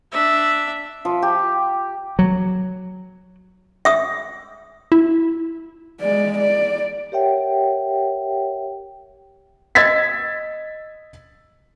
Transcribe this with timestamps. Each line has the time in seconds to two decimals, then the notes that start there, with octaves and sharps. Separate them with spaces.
0.12 D4 E5
1.05 F3
1.22 G4
2.19 F#3
3.85 E5 D#6 E6
4.92 E4
6.01 G#3 D5
6.39 D5
7.12 G4 A#4 C#5 E5 F#5 G5
9.75 D#5 E6 G#6 A6 B6